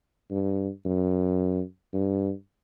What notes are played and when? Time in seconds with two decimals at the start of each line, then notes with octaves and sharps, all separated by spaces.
0.31 G2
0.85 F#2
1.93 G2